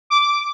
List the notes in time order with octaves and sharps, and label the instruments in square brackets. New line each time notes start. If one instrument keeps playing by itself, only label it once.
[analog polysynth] D6